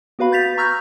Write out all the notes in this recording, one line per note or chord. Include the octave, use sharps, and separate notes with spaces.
B3 F#4 B4 F5 B5
G6 A6 B6 F7
A#5 C#6 E6 F6 G6 A#6